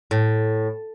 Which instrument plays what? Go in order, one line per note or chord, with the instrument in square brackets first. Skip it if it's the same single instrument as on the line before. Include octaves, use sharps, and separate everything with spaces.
[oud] A2